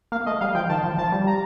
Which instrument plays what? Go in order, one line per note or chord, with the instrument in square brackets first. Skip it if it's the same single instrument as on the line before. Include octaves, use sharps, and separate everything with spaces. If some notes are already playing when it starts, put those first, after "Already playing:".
[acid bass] A#3 [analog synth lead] F5
[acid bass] A3 [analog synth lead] D#5
[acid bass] G3 [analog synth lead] F5
[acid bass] F3 [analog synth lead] G5
[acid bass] D#3 [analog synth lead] A5
[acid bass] F3
[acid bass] F3 [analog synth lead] A5
[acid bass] G3
[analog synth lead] A#5